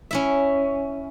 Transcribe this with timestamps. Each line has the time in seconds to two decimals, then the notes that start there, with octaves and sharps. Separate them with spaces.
0.11 C#4 E4 E5